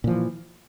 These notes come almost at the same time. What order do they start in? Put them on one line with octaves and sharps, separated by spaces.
A#2 F3 E3